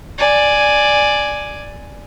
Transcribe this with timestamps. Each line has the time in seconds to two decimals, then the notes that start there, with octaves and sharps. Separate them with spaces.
0.18 D5 G#5